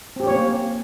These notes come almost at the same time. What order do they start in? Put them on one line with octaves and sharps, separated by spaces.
C4 G4 C#4 C#5 A#3